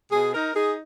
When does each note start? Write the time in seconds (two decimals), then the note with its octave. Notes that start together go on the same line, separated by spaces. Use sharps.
0.11 B2 G#4
0.33 D#4 A#4
0.55 D#4 G#4